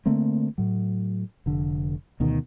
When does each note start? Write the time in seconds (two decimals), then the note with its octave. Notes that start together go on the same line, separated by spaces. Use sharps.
0.06 D3 A3 A#3 C4
0.58 A2 F#3
1.46 F1 D3
2.20 D2 B2 D#3